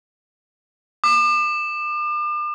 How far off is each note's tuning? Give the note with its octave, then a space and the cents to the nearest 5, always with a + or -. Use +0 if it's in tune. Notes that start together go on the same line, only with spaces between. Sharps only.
D6 +40